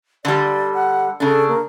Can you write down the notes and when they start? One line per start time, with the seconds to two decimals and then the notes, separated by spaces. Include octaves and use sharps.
0.25 D3 G3 D5
0.74 F#5
1.20 C#3 D4 A4
1.48 A#3